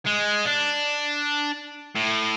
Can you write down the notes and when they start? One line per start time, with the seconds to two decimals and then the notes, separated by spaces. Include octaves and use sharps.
0.06 G#3
0.45 D4
1.95 A2